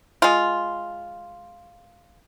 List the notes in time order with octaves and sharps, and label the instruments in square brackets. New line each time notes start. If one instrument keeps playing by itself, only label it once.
[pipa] G#3 F4